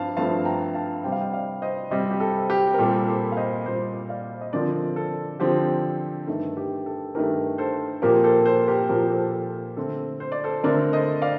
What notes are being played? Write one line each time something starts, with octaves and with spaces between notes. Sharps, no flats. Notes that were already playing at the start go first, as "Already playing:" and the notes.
Already playing: G2 F3 C4 F5 A5
G2 F3 A3 C4 F5 A5
G5 A#5
F5 A5
C3 G3 C4 G5
F5
D#5 G5
D5 F5
C5 D#5
C3 G3 C4 C5 D#5
G4
A4
G4
A#4
A#2 G3 C4 A4
A4 C5
F5
C5 D#5
A#2 G3 C4 C5 D#5
D5 F5
D#5
D3 F3 C4 A#4 D5
A4
D3 F3 C4 G4
G2 D#3 A3 A4
G4
A4
G2 D#3 A3 G4 A#4
A4 C5
A#2 F3 A#3 G4 A#4
A4 C5
A4 C5
G4 A#4
A#2 F3 A#3 G4 A#4
A4 C5
A4
D3 A3 C4 A4
C5
D5
A4 C5
D3 A3 C4 A#4 D5
C5 D#5
D5 F5